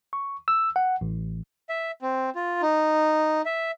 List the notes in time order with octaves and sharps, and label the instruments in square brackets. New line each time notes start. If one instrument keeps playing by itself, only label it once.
[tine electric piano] C#6
E6
F#5
A1
[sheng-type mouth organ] E5
C4
F4
D#4
E5